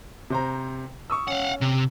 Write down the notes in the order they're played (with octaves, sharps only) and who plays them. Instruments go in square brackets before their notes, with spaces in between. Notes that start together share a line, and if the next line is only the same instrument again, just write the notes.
[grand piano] C3 C5 A#5
C#6 D#6 E6
[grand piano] C#4 [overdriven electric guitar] F5 F#5
[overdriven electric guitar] C3